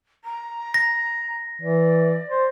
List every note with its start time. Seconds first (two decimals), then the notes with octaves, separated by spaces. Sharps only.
0.24 A#5
0.74 A#6
1.62 E3 D5
2.29 C5